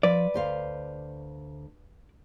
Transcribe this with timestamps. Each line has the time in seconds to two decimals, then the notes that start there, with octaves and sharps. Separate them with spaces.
0.03 F3 B4 D5
0.34 D2 C5 F5